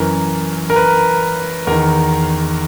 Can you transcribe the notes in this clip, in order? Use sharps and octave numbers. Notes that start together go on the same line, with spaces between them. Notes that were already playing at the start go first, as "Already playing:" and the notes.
Already playing: F#2 E3 A#4
A#4
B4
E2 D#3 A#4